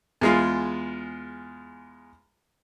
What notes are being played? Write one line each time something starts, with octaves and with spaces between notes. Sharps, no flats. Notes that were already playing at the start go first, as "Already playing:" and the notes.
E2 G#3 F4